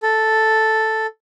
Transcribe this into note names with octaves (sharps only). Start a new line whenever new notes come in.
A4